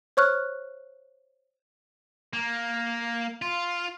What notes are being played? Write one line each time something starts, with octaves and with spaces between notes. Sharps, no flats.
C5 C#5 C#6 F6 F#6
A#3
F4